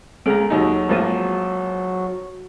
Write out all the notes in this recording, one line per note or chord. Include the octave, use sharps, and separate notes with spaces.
C#2 G#4 A4 A#5 D7
D#2 F#3 D#4
G#1 F3 A#3 A#4 A6 D#7